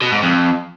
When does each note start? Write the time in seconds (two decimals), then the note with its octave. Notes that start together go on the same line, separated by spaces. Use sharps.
0.01 B2
0.12 G#2
0.23 F2